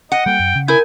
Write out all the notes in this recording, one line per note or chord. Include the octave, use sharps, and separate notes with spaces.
D#5 F#5
G3 A#3 G5
F#2
C#3
E4 A#4 G#5 G6